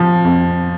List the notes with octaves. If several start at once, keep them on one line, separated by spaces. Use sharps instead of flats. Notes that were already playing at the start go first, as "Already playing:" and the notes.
Already playing: F3
F2